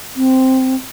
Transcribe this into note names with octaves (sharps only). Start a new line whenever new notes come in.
C4